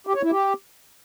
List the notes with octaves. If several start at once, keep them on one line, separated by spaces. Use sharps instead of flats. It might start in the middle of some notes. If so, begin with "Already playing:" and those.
G4
C#5
E4
G4